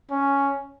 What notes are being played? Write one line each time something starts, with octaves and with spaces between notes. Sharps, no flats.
C#4